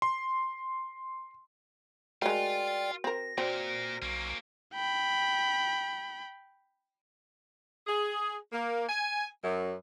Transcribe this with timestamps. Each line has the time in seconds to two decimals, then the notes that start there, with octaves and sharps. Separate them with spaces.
0.02 C6
2.22 G#3 A3 F4 F#4 A#4 D5 G5
3.04 C4 A#4 A#6
3.38 A#2 C4 F#4 A#4 C5 D5
4.02 B1 A#3 C#4
4.74 G5 B5
7.86 G#4
8.52 A#3
8.88 G#5
9.43 F#2